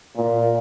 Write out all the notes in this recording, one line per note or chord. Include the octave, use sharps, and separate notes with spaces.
A#2